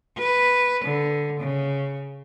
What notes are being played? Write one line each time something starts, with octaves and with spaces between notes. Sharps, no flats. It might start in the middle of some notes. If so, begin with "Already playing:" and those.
B4
D3
C#3